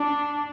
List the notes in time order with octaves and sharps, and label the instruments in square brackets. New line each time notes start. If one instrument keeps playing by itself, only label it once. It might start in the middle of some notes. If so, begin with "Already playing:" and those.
Already playing: [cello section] D4